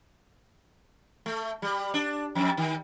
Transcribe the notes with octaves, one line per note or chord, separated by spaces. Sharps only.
A3
G3
D4
F2
D#3